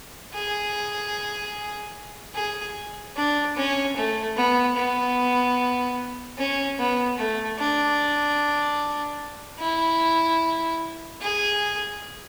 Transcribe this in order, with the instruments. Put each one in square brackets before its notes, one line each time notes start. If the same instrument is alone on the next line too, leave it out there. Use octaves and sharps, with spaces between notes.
[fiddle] G#4
G#4
D4
C#4
A3
B3
B3
C#4
B3
A3
D4
E4
G#4